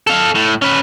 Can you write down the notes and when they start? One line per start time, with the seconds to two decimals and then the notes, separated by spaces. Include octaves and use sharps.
0.07 A4 F5
0.35 A2
0.62 C#4 B4